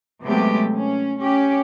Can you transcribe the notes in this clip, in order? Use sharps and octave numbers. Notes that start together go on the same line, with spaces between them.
C3 F#3 G#3 A3 B3 G4
C#4
C#4 G4